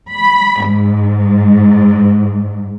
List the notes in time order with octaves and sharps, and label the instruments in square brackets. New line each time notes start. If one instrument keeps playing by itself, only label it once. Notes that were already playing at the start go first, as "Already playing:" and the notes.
[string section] B5
G#2